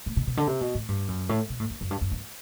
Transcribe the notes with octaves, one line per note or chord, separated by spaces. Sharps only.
A2
B2
B2
D3
C3
B2
A2
G2
F#2
A2
B2
A2
F#2
F#2
G2
F#2
G2